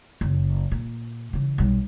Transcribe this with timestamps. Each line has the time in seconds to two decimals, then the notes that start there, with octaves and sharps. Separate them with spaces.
0.21 F#1
0.72 A#2
1.33 C#3 E3
1.58 B1 G3